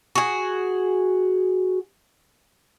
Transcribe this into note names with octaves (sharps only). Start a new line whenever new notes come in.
F#4 G#4